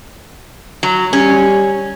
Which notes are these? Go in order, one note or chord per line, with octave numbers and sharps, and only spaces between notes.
F#3
G3 C#4